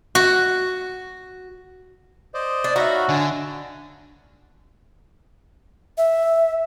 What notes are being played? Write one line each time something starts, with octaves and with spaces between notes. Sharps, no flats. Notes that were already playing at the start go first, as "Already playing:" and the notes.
F#4
C5 D5 D#5
D4
D#4 F#4 C#5 E5 F5 A#5 B5
D3 G#5 A5
E5